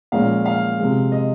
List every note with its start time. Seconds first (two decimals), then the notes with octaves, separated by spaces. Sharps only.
0.12 A#2 F3 G#3 C#4 F5
0.45 F5
0.79 C3 F3 G#3
1.12 D#5